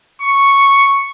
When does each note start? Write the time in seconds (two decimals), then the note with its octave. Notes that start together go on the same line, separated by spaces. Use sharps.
0.22 C#6